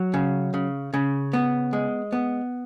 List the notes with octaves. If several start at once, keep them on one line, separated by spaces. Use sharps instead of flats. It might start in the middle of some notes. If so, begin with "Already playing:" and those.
Already playing: F#3
C#3
C#3
C#3
B3
G#3
B3